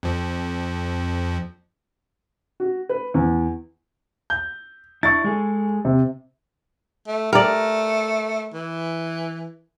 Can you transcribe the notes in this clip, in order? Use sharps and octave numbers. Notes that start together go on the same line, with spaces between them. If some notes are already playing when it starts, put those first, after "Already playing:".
F2 F3
F#4
B4
E2
G6
D4 E4 C#6 A6
G#3 G#4 A4
C3
A3
A3 A#4 D5
E3